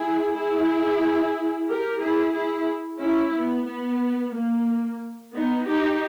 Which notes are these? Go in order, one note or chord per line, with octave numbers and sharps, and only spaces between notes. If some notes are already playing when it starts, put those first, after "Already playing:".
Already playing: E4 G#4
E4 G#4
G4 A#4
E4 G#4
E4 G#4
C#4 E4
B3
B3
A#3
B3 D#4
D#4 G4